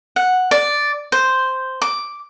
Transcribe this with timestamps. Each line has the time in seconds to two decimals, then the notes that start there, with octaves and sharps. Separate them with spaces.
0.16 F#5
0.51 D5
1.12 C5
1.82 D6